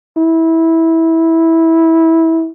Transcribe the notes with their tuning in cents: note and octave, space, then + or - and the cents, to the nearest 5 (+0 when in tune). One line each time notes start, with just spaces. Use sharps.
E4 -15